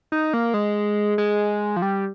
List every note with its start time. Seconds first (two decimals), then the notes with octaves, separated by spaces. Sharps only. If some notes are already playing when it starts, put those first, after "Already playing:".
0.12 D#4
0.34 A#3
0.54 G#3
1.18 G#3
1.76 F3
1.82 G3